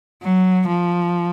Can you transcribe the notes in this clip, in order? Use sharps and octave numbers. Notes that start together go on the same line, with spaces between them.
F#3
F3